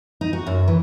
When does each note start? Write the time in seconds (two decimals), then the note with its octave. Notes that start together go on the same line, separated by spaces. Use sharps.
0.21 D#4
0.33 F#4
0.47 F#2
0.68 E3